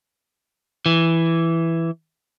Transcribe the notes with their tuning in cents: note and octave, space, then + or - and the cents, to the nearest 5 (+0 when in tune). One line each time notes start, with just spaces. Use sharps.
E3 +5